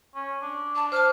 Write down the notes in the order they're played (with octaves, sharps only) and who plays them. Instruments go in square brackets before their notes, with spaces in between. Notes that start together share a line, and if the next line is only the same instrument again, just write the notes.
[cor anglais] C#4
D4
[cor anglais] D4 [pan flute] A5
[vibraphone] C5 A5 [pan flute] F6